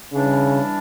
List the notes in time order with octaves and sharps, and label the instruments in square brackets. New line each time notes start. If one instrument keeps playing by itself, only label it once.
[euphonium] C#3 [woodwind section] E3 G3 D4